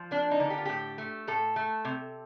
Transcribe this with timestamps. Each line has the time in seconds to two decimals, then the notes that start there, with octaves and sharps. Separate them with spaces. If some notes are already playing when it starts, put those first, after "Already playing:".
Already playing: F3
0.11 A#3 D4
0.31 D#4
0.40 D3
0.50 G4
0.57 F4
0.65 A2 G4
0.98 A3
1.27 A2 A4
1.56 A3
1.85 C3